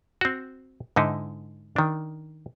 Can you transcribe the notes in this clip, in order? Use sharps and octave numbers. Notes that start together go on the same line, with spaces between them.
C4 F#4
G#2 D3 D#4 E4
D#3 D4